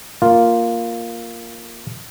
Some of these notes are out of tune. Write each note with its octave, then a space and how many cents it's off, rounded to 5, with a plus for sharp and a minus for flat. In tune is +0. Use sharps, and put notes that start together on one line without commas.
A#3 +0 F4 +0